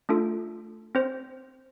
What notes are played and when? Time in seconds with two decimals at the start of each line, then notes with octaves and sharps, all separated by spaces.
0.09 A3 D4 F4 A4
0.95 C4 C5